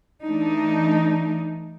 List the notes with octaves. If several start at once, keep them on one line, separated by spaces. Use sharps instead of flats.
E3 A3 D4 D#4